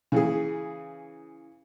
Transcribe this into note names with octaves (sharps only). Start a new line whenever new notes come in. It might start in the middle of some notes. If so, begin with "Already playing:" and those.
C#3 E3 G#4